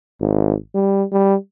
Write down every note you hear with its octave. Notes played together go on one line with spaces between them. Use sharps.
G#1
G3
G3